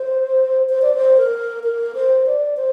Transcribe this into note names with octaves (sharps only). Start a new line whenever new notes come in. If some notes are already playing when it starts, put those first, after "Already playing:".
Already playing: C5
C5
D5
C5
A#4
A#4
C5
D5
C5